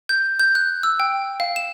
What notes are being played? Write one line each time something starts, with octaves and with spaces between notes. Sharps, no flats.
G6
G6
F#6
E6
G5
F5
E7